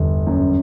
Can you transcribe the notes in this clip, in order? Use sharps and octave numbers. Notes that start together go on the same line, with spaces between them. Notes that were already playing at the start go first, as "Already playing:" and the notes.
Already playing: G1 E2
F#2